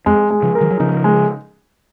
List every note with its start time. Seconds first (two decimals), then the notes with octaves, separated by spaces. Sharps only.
0.06 F2 G#3
0.30 G#3
0.43 C#3 F3
0.55 A#4
0.61 D#3 F#3
0.71 F#3
0.79 C#3 F3 D#4
1.04 G#3